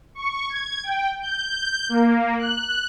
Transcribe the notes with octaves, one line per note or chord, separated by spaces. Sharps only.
C#6
G#6
G5
G6
A#3
F#6